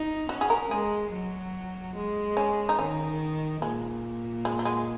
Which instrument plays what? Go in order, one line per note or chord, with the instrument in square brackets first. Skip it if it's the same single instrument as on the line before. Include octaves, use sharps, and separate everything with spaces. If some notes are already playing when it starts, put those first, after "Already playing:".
Already playing: [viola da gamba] D#4
[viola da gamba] C#4 [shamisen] F#4
[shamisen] G#4
A#4
[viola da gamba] G#3 [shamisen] G#4
[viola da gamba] F#3
G#3
[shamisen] C#4
D#4
[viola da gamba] D#3 [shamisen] C#4
[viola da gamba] A#2 [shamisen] G#3
[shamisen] G#3
F#3
G#3